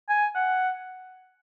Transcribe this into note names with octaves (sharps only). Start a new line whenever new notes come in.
G#5
F#5